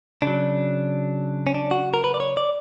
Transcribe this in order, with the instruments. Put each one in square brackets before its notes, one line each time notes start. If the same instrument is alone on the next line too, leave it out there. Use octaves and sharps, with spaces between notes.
[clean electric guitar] C#3 F#3 D4
C#4
D4
F#4
A#4
B4
D5
C#5
D5